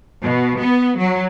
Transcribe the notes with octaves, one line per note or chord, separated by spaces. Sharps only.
B2
B3
F#3